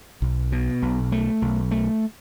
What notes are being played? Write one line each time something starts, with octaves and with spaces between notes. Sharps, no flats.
B1
B2
B1
A3
B1
A3